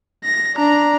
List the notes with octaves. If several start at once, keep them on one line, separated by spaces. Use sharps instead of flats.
A#6
D4 A#5